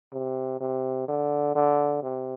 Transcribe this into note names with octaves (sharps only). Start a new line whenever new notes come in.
C3
C3
D3
D3
C3